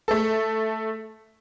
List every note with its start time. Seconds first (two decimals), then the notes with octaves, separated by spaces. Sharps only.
0.08 A3 A4